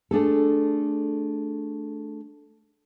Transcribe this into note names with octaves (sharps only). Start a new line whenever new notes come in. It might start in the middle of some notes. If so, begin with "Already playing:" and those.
A3 D4 G#4 A4